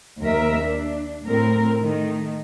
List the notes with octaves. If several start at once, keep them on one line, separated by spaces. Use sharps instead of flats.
D#2 A#4 E5
D4
A2 C4 A#4
D#3 A3